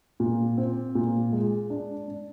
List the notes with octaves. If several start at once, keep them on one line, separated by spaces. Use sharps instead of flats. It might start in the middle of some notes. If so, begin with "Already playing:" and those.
A#2
C4
A#2
G#3
D4
D4